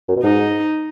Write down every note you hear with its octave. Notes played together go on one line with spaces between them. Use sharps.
F#2
B2
G#2 D#4